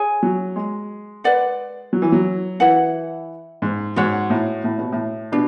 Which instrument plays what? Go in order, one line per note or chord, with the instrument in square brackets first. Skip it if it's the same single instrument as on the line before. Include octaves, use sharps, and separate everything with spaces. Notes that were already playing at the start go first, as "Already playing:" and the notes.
Already playing: [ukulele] G#4 C#5 G#5
[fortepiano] F#3
G#3
[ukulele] B4 D5 F#5
[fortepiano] F#3
E3
F#3
[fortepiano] E3 [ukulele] E4 B4 F#5
[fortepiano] G#2
[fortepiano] G#2 [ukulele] F#4 C#5 F#5
[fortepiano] A2
A2
B2
A2
[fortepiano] B2 [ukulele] D4